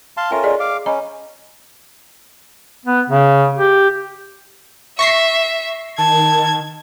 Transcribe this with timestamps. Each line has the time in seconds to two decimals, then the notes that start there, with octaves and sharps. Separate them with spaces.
0.17 F5 A5 C6
0.31 C#4 F4 A4 A#4 E5 G5
0.44 G#4 D5 D#5
0.60 F5 D6
0.86 C#4 D#5 A#5 B5
2.86 B3
3.09 C#3
3.57 G4
4.99 E5 C#6 A#6 C7
5.98 D#3 A5 G#6